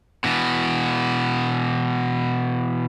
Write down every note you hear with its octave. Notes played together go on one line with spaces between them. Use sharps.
B2 E3